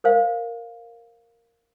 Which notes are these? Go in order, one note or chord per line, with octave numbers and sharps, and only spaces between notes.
A#4 C5 F5